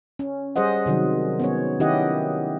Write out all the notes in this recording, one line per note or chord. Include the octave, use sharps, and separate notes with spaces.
C#4
G3 G#4 C5 D#5 F#5
C3 D#3 F#3
B3 C#4 C#5
D#3 C#4 E4 G4 D#5 F#5